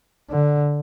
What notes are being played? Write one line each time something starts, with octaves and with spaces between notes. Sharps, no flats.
D3